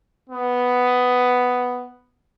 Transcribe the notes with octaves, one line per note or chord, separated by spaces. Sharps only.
B3